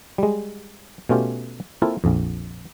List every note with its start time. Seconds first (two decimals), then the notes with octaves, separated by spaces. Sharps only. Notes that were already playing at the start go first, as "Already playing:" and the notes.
0.18 G3 G#3
1.09 B2 A3 C#4 F4 G4
1.82 A#3 C4 E4 F4 A4
2.04 A#1 F2